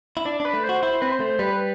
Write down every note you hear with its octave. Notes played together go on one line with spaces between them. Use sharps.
E4
D4 D5
D4 B4
A3
C5
F#4
E4 C5
C4 B4
C5
A3
G3 B4